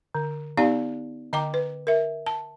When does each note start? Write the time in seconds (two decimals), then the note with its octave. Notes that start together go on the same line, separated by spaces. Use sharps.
0.15 D3
0.57 B3 D#4 G4 D5 F5 A#5
1.33 D3 D#5 G5 A#5 D6
1.54 B4
1.87 A#4 E5
2.26 A5